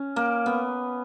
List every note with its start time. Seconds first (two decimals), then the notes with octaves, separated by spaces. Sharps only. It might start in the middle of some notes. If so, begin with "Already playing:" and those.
Already playing: C#4
0.16 A#3
0.46 B3